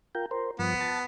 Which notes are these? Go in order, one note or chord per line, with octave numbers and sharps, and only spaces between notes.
F4 A#4 G5
A#4 C5
G2 F3 B3
A5